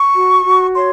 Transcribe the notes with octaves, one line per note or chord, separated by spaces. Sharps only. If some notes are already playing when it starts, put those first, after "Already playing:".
Already playing: C#6
F#4
F#4
C#5 C6